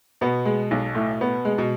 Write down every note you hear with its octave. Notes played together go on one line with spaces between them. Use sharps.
B2 B3
G#3
B1
A2
B3
G#3
B2